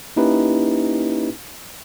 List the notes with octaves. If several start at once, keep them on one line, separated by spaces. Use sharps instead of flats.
A#3 C#4 D#4 E4 G4 B4